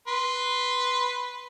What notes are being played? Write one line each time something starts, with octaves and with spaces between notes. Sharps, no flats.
B4 C6